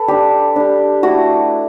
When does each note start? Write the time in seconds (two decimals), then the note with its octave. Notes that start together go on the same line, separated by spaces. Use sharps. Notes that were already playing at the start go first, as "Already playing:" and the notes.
Already playing: A4 B4
0.08 G3 D4 G4
0.56 G3 D4
1.03 A3 E4 F#4